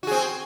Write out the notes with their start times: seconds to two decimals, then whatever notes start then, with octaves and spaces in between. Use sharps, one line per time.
0.03 F#4
0.07 G#4
0.11 C4